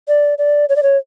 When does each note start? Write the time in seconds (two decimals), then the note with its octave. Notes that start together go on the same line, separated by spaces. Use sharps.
0.08 D5
0.38 D5
0.69 C#5
0.76 D5
0.83 C#5